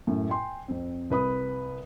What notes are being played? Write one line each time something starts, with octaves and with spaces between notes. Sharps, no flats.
F#2 A2
G5 G#5 C6
F2 C4
C2 B4 B5 D#6